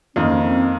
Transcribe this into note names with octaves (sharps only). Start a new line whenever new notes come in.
F2 D#3 A#3 C#4 D#4
C4